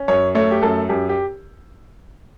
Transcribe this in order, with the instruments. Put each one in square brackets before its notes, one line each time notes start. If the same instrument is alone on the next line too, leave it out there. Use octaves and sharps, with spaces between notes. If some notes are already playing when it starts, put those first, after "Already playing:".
Already playing: [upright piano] C#4
F#2 C#5
A3 C#5
G4
F#2 A4
F#2 G4
G4